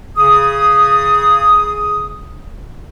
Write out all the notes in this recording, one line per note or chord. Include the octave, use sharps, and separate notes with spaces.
C#3 G#4 D#6